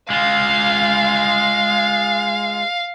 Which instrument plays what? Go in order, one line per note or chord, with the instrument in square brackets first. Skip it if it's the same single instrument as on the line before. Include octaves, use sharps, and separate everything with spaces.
[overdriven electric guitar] G#3 F4 [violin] F5